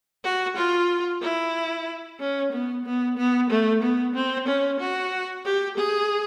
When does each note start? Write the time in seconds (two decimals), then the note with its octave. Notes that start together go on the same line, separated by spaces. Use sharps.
0.24 F#4
0.57 F4
1.22 E4
2.20 C#4
2.52 B3
2.85 B3
3.17 B3
3.50 A3
3.82 B3
4.15 C4
4.47 C#4
4.79 F#4
5.45 G4
5.78 G#4